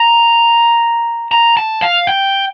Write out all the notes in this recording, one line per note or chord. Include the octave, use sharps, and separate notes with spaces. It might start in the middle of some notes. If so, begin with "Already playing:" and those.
Already playing: A#5
A#5
A5
F5
G5